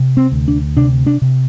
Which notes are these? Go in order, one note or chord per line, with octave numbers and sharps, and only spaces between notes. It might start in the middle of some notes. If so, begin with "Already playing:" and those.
Already playing: C3
C4
D2
D4
C3 D4
D4
C3